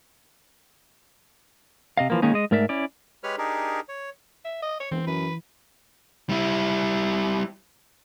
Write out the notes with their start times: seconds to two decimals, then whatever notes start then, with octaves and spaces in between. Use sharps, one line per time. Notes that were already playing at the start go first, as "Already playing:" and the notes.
1.97 C3 D#5 F5
2.10 E3 F3 A#3
2.22 D#3 G#3 A#3 C#4 D#4
2.34 G#3 D#5
2.51 G#2 A3 A#4 D5 E5
2.69 C#4 E4 D5
3.24 G#3 G4 B4 C#5 F6
3.38 D4 D#4 G4 G#4 A#4
3.89 C#5
4.45 E5
4.62 D#5
4.80 C#5
4.91 E1 E3 C4
5.07 F#2 B4
6.29 G3 E4